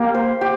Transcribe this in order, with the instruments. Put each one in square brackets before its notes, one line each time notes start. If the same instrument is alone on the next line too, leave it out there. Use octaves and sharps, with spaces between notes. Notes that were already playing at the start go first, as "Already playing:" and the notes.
Already playing: [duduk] A#3 [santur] G4
[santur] C5
G4